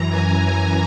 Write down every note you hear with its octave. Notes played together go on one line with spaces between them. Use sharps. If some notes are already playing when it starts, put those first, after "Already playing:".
Already playing: F#2 E3 A#5
G#5
A#5